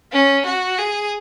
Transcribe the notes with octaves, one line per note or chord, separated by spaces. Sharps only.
C#4
F#4
G#4